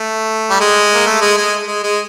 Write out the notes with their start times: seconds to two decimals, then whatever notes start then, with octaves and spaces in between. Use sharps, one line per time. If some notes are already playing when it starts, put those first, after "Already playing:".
Already playing: A3
0.50 G3
0.60 G#3
0.94 A#3
1.06 A3
1.22 G#3
1.37 G#3
1.67 G#3
1.83 G#3